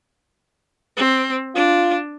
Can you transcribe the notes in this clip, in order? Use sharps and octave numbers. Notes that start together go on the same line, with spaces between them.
C4
D4 F4